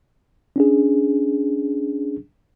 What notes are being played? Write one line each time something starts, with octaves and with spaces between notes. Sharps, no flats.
C#4 D4 G#4